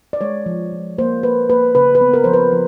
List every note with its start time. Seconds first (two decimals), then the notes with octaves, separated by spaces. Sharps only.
0.13 D5
0.21 G#3 C#5
0.46 F3
0.72 G#3
0.98 A#3 C5
1.23 A#3 B4
1.50 A#3 B4
1.75 C#3 B4
1.95 B4
2.01 B3
2.14 A#4
2.24 F3 C5
2.34 B4
2.52 F3